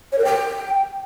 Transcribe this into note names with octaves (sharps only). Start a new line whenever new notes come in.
C#5
A#4
G5